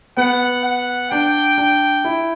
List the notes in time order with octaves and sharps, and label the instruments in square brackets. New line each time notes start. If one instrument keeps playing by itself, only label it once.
[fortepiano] B3 [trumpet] F#5
[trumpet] F#5
[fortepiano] D4 [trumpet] G5
[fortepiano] D4
E4